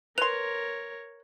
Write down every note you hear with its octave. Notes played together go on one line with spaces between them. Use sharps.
A#4 B4 C#5 C6 F7